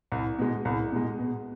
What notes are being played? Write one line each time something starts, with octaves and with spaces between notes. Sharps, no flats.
C2
B2 G#3
C2
B2 G#3
B2